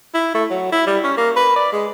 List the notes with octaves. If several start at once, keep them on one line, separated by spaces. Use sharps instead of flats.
E4
A3
F#3
E4
G3
C#4
A#3
B4
D5
G#3